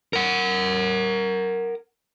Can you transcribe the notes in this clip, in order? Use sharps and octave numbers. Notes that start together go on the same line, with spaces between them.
A#4 F#5